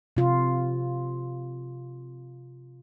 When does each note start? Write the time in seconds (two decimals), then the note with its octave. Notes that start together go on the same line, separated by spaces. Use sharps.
0.17 C3 F4